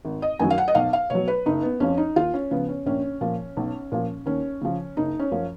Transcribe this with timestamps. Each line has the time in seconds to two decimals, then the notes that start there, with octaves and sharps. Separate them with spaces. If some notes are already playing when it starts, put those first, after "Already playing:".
0.05 G#1
0.22 D#5
0.39 F#2 D#3 F#3 G#5
0.50 F5
0.58 F#5
0.68 D#5
0.75 B1 F5
0.93 F5
1.10 B2 F#3 C#5
1.28 B4
1.46 F#1 D#4
1.62 B3
1.80 F2 F3 C#4
1.97 D#4
2.16 D#2 F4
2.34 C#4
2.51 C#3 F3 B3
2.68 C#4
2.86 A#1 C#4
3.21 A#2 F3
3.57 B1
3.92 A#2 F3
4.26 D#2 C#4
4.61 C#3 F3
4.97 F#1 D#4
5.19 C#4
5.31 F#2 F3